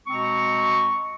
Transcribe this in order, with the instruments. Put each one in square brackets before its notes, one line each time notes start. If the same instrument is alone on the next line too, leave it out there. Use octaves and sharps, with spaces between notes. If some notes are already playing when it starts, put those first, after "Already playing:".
[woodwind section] B2 G#3 C4 A#5 C#6